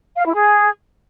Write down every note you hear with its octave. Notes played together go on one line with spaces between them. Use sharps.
F5
E4
G#4